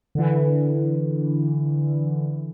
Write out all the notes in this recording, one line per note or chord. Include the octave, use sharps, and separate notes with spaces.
D3 E3